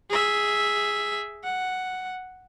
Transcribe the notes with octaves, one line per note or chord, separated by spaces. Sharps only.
G#4 E5
F#5